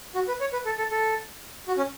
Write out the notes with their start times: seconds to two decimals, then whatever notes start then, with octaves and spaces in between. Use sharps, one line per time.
0.15 F#4
0.28 B4
0.41 C#5
0.53 B4
0.66 A4
0.78 A4
0.91 A4
1.68 F#4
1.77 C#4